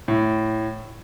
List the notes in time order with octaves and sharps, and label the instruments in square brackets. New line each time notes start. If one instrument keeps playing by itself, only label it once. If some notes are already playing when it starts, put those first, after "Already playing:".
[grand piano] A2